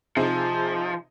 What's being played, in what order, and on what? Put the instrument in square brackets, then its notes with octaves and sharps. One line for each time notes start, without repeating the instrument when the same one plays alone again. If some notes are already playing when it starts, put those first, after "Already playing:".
[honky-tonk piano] C3 D#4 G#4 [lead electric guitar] F3